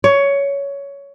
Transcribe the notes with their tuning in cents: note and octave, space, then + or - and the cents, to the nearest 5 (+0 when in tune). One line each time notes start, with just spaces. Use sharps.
C#5 +15